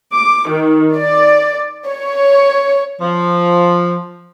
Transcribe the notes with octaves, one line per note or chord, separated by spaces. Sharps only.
D6
D#3
D5
C#5
F3